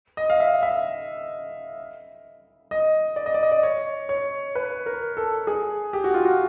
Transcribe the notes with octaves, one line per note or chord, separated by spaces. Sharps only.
D#5
F5
E5
E5
D#5
D5
D#5
D5
D#5
D5
C#5
C#5
B4
A#4
A4
G#4
G4
F#4
F4
F#4